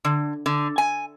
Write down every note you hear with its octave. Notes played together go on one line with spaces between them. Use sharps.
D3
D3
G#5